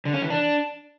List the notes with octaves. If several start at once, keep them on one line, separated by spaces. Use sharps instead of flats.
D3
C#4
E3
D4